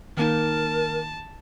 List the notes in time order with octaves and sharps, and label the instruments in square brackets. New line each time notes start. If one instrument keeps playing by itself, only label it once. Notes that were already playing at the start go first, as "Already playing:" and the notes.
[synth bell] D#3 A#3 D#4 [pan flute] A#4 [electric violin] A5